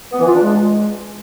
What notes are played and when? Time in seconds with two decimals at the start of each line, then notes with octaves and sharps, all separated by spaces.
0.12 B3
0.19 E3
0.27 F4
0.35 D4
0.42 G#3